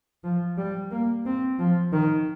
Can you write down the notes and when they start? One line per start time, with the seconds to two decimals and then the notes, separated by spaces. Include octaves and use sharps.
0.24 F3
0.57 G3
0.91 A#3
1.25 C4
1.59 F3
1.93 D#3